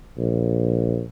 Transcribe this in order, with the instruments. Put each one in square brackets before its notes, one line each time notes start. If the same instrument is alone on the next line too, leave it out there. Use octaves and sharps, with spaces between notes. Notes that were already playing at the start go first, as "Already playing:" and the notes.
[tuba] A#1